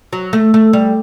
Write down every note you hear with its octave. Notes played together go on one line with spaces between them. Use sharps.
F#3
A3
A3
G3